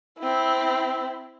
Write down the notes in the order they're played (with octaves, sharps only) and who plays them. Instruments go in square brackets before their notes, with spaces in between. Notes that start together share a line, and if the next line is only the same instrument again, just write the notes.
[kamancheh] C4 E4